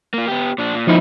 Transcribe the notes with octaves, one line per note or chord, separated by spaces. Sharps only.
A#3 F4
B3 G4
A#2 D4
A#2
F2 A#2 D#3 F3 D#4 E4